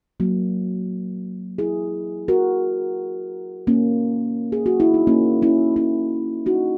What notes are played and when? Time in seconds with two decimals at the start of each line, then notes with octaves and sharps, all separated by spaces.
0.20 F#3 A#3
1.58 E4 G#4
2.28 F#4 A#4
3.67 A#3 C#4
4.52 G#4
4.66 F#4
4.80 E4
4.94 D#4
5.07 A#3 C#4
5.42 C#4 E4
5.76 C#4 E4
6.46 D#4 F#4